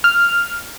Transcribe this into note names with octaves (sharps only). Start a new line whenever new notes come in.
F6